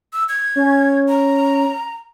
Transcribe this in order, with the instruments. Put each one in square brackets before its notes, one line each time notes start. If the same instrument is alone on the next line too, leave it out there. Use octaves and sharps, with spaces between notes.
[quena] E6
G#6
[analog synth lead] C#4
[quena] A#5